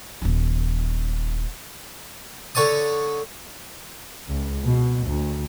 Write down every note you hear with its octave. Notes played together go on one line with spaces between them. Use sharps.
D#1 D#3
D3 C#5 A5 D#6
C#2
B2
D2